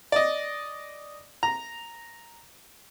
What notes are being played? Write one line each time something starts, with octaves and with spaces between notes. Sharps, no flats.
D5 D#5
A#5